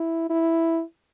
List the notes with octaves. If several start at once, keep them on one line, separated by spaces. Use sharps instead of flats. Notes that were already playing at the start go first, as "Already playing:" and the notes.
Already playing: E4
E4